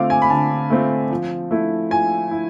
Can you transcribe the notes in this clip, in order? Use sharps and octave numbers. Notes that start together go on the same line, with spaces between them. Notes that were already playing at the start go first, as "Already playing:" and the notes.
Already playing: D3 A3 C4 F4 F5 D6
G#5
B5
D3 A5
A3 C4 F4
F3
A3 E4
F3 G#5
E4